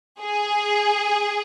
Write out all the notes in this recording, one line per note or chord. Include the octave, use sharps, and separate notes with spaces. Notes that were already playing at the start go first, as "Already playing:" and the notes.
G#4